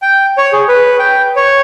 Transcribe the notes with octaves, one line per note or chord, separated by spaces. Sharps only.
G5
C#5
G#4
B4
G5
C#5